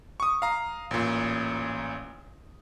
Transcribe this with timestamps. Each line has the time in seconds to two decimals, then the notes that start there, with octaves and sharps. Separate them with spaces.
0.20 C#6 D#6
0.42 F5 A#5
0.91 A1 A#2